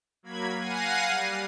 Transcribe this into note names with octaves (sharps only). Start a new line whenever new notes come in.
F#3 A#3 B5 G#6
F5 F#5 G#5 A#6 C7 D#7
G3